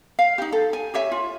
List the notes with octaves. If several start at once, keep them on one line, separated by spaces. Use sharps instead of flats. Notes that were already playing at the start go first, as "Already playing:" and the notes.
F5
D#4 G4
A4
G#5
G4 C#5 E5 G#5
F4